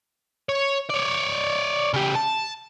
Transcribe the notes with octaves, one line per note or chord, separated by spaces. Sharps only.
C#5
C#5 D5
C#3 G4
A5